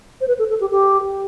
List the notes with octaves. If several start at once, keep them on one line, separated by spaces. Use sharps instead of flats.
C5
B4
A4
A4
G4
G4